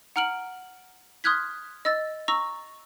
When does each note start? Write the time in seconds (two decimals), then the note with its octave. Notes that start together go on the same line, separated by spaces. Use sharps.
0.16 F#5 A#5 F6 D7 F#7
1.24 C6 D#6 F6 F#6 G#6 B6
1.85 D#5 E6 A6
2.28 A#5 C#6 E6 A#6